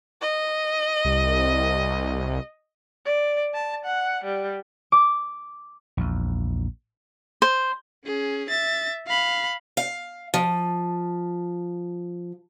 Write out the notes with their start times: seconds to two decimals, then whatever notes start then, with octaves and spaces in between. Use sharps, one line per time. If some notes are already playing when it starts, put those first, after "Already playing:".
0.22 D#5
1.05 C2
3.05 D5
3.54 A5
3.85 F#5
4.24 G3
4.92 D6
5.97 A#1 E2
7.42 C5
8.05 C#4 G#4
8.50 E5 A6
9.07 F5 B5
9.77 F5
10.34 F3